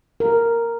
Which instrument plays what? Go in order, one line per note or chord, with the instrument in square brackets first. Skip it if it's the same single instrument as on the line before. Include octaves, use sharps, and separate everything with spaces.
[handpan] A#4